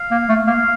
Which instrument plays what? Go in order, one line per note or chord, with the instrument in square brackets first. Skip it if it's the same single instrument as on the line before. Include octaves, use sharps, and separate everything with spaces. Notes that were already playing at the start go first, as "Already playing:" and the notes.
Already playing: [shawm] F5
[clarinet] A#3
A3
[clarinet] A#3 [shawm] F5